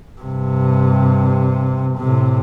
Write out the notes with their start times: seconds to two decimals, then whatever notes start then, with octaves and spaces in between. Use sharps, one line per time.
0.21 G2 C3
1.98 A2 C3